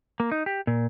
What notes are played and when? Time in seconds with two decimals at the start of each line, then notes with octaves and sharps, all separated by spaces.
0.20 A#3
0.32 D#4
0.46 G4
0.67 A#2